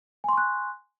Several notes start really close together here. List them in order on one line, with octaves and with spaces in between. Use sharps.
G#5 C6 C#6 F#6